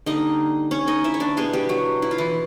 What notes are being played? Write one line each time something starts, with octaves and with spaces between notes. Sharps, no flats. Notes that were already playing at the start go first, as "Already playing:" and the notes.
D3 G3 A#3 D#4 D#5
C#4 C#5
D#4 D#5
E4 E5
C#5
D4 D5
B2 G3 G#3 B3 G#4
G3 G4
F#3 F#4
E4
F4
E3 E4